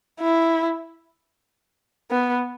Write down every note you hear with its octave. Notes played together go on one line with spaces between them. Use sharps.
E4
B3